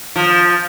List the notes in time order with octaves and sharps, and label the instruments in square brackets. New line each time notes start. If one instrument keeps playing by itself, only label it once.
[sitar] F3